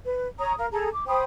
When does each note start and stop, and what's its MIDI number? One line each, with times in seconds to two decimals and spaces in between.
0.04 0.27 71
0.38 0.53 73
0.38 0.53 82
0.38 0.53 87
0.57 0.67 70
0.57 0.67 77
0.72 0.88 68
0.72 0.88 69
0.72 0.88 81
0.72 0.88 82
0.92 1.04 86
1.07 1.23 72
1.07 1.23 79
1.07 1.23 83
1.07 1.23 87